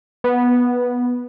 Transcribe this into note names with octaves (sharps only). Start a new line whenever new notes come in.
B3